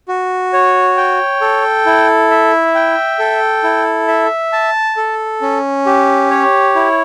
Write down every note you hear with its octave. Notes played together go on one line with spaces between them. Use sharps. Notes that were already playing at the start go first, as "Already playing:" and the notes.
F#4
C#5
G5
A4
E4
E5
G5
A4
E4
E5
A5
A4
C#4
G4
C#5
E4